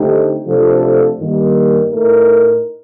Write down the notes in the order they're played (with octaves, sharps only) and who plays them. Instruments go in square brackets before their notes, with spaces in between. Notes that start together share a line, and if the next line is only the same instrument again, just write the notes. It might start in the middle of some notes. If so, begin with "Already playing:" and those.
Already playing: [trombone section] D3 A3 C4 D#4 G4
C3 F3 A3 D4 A4
G2 D#3 G3 A#3
A2 A3 D#4 A#4